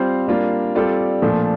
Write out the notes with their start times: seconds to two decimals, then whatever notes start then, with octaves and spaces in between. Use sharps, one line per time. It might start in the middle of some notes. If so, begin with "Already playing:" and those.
Already playing: G3 C4 F4 C5 F5
0.28 G3 A#3 D4 F4
0.75 G3 C4 F4 A4 D5
1.22 A#2 F3 A3 D4